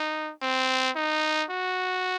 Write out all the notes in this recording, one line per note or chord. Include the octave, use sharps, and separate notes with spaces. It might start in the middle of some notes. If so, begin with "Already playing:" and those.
Already playing: D#4
C4
D#4
F#4